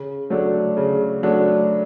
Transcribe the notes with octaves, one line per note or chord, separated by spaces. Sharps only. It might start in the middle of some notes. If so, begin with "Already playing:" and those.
Already playing: C#3
F#3 A3 D4
C#3
F#3 A3 D4